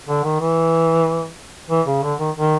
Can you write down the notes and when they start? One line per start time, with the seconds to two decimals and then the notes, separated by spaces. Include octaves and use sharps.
0.08 D3
0.24 D#3
0.40 E3
1.70 E3
1.86 C#3
2.03 D3
2.19 D#3
2.36 D#3